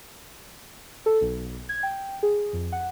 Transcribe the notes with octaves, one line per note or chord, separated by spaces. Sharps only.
A4
B1
G#6
G5
G#4
F2
F#5